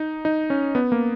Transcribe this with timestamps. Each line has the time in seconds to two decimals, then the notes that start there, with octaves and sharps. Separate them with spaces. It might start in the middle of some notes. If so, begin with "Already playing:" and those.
Already playing: D#4
0.25 D#4
0.50 C#4
0.75 B3
0.92 A#3